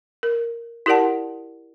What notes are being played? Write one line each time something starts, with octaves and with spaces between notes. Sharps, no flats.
A#4
E4 G4 A#4 D5 F#5 A5